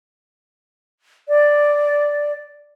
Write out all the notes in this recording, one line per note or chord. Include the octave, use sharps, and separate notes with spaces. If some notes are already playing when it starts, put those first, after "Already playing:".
D5